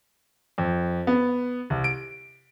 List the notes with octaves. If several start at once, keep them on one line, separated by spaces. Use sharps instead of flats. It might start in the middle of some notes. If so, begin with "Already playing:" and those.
F2
B3
C2
D7